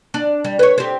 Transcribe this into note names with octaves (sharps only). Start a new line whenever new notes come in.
D4
G3
B4 C#5
C4 G4